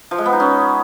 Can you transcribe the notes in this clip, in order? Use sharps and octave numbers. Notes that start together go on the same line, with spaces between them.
F3
G#3
B3
D#4
C#4